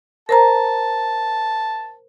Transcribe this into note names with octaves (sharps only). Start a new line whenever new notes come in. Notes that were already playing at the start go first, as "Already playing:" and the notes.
A#4 C5 A5 A#5